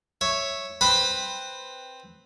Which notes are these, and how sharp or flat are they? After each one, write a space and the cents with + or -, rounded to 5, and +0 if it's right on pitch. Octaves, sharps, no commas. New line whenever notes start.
C#5 +0 E5 +0
C4 +0 B4 +0 B5 +0